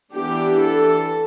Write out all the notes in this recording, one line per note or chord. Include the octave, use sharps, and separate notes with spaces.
E3 B3 D4 G4
A4